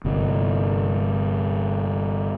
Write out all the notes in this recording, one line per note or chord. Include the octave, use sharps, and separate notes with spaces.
G1 C3